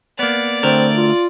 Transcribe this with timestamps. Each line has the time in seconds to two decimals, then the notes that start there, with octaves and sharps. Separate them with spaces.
0.19 A#3 B3 D5
0.63 D2 A3 C4 A#4
0.96 F4